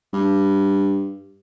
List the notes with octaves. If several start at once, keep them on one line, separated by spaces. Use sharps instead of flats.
G2